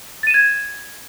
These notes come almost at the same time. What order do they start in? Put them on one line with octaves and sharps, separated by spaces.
A6 D#7 E7 G#6